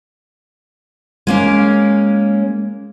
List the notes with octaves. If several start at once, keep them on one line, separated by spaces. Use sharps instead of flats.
G#3 A#3 C#4